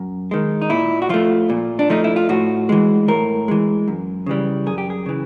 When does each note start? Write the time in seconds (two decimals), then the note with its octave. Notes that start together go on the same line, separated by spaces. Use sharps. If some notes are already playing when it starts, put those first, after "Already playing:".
Already playing: F#2
0.31 D#3 G#3
0.62 D#4
0.70 A#2 E4
1.02 F#4
1.09 F3 A3 F4
1.50 A#2
1.79 D4
1.90 F3 A3 D#4
2.04 E4
2.16 F4
2.29 A2 F#4
2.69 E3 G#3
3.08 A2 A#4
3.48 E3 G#3
3.88 F#2
4.26 C#3 E3 G3
4.66 F#2 G#4
4.78 G4
4.90 G#4
5.06 C#3 E3